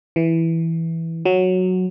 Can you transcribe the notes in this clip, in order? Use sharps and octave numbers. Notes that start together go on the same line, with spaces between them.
E3
F#3